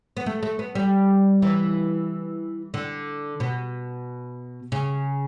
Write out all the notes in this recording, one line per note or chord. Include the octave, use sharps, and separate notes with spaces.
B3
A3
A3
B3
G3
E3
D3
B2
C#3